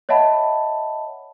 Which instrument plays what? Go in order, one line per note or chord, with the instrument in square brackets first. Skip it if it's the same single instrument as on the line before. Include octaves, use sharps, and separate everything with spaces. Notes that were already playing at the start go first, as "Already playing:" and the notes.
[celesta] C#5 D#5 E5 F#5 A5 B5